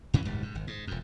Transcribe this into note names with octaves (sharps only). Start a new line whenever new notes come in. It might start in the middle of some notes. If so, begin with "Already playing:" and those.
F#2 C#3 E3 C#4
D#1 G#2 G3
G#2
G#1
G#2
E1 F2